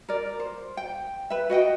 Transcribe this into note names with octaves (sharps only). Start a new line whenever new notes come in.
A#4 D5
C5
G5
B4 E5
F#4 D#5 F#5 G5